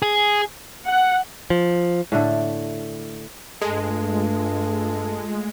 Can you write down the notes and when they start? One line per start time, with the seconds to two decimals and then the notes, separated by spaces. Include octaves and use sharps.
0.02 G#4
0.86 F#5
1.50 F3
2.12 A2 D3 A3
3.62 G2 G#3 A3 F4 A4